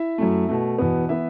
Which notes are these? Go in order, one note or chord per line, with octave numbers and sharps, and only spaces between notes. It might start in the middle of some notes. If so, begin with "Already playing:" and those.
Already playing: E4 E5
F#2 F#3 A3
B2 A3
E2 B2 B3
E3 B3 E4 E5